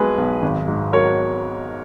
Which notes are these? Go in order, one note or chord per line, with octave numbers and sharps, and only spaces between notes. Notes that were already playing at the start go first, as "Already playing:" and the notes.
Already playing: B1 B2 G#3 G#4 B4
B1
G#1
G#2
F#3 A#4 C#5